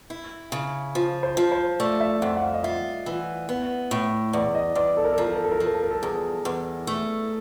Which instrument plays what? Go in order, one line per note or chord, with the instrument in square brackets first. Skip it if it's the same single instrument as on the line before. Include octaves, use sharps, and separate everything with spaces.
[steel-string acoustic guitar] E4
C#3
F3
[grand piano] C5
[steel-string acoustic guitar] F3
[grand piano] C5
[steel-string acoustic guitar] A3 [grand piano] D5
[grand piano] E5
[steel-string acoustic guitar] F2 [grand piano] F#5
[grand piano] F#5
F5
D#5
[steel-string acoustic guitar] F4 [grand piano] E5
[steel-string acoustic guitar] E3
B3
A2
[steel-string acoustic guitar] E2 [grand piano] D5
[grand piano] D#5
[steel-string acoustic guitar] E2 [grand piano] D5
[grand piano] A4
A#4
A4
[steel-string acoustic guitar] F3 [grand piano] A#4
[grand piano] A4
A#4
A4
A#4
[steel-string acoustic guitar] F3 [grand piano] A4
[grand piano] A#4
A4
A#4
A4
[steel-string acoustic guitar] E2 [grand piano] G#4
[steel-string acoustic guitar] E2
A3